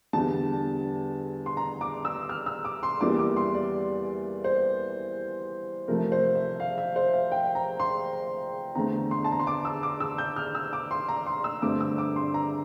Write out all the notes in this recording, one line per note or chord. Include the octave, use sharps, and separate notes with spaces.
E2 D3 G3 A5
C6
A#5
D6
E6
F6
E6
D6
C6
E2 E3 G3 A#3 D6
D6
C6
D5
C5
C3 F3 A3 A#4
C5
E5
F5
E5
C5
F5
G5
A#5
C6
E2 D3 A3 C4 A#5
C6
A5
A#5
C6
D6
E6
D6
E6
G6
F6
E6
D6
C6
A#5
C6
E6
G2 D3 A3 C4 D6
E6
D6
C6
A#5